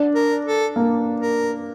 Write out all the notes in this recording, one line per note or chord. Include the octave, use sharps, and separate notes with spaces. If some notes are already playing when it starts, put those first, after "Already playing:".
Already playing: D4
A#4
A4
A#3
A#4